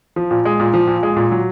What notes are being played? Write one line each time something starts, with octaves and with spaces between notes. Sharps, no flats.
F3
A#2
G#3
A#2
F3
A#2
G#3
A#2
F#3